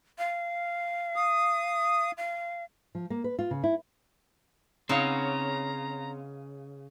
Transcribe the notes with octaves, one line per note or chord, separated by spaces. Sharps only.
F5
D#6
F5
F3
A#3
B4
F4
C#3
E4
C#3 B3 C4 D#4 C#5 F5 A#5